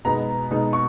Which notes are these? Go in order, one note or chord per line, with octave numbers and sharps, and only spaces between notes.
B2 G#3 B3 D#4 A#5
B2 G#3 B3 D#4
C#6